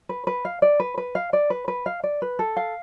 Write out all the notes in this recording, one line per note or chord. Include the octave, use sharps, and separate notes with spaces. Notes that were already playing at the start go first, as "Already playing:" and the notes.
B4
B4
F5
D5
B4
B4
F5
D5
B4
B4
F5
D5
B4
A4
F5